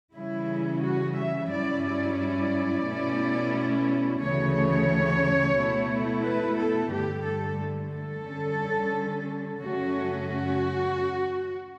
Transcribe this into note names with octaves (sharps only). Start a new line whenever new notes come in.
C#3 E3 G3 C#4 E4
F#4
E5
G2 F#3 C#4 E4 D5
D5
D5
B2 A3 C#4 E4
D2 C#3 E3 A3 C#5
C#5
B2 A3 E4
B4
A4
G2 D3 A3 G4
A4
A4
D3 G3 C#4
F#2 C#3 F#3 A3 C#4 F#4
F#4